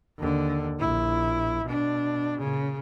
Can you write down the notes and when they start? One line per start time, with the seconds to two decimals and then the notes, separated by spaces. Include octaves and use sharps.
0.18 D#2 D3
0.79 A#1 E4
1.65 B2 D4
2.38 A#2 C#3